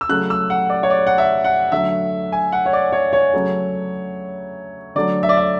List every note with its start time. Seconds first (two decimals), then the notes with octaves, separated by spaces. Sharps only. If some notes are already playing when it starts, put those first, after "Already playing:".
0.01 E6
0.09 C#3 F#3 A3 F#6
0.30 E6
0.50 F#5
0.70 D5
0.83 C#5
0.90 D5
1.07 F#5
1.18 E5
1.44 F#5
1.72 D3 F#3 A3 E5
2.32 G#5
2.52 F#5
2.66 C#5
2.73 D5
2.92 C#5
3.13 C#5
3.33 C#3 F#3 A3
4.95 D3 F#3 A3 D5
5.23 E5
5.29 D5
5.37 E5